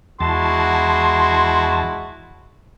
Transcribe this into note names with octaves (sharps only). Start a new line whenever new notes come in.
E2 G#3 E4 F#4 A5 C6